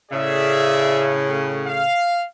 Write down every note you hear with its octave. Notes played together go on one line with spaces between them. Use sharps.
A2 C#3 G#4 D5 E5
F5